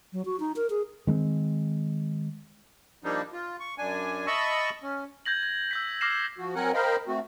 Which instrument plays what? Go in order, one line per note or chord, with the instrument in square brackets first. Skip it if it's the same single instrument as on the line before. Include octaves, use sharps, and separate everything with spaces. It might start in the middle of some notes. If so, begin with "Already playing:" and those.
[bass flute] F#3
F#4
D#4
A#4
G#4
[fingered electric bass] D#3 G#3 A3 C4
[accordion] F3 G3 A#3 D4 D#4
F4
C#6
F#2 D4 G#5
D#5 E5 A5 B5 C#6 E6
C#4
[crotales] G6 G#6 A#6 F#7
G#6
E6 G6 B6
D6 F6 A#6 C7 E7
[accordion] F3 F#4
F#3 C4 A#4 F#5 G#5 F#6
A#4 C5 D#5 F5 G5 B5
A3 C4 F#4